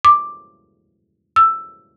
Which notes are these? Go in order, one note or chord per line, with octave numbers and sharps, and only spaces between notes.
D6
E6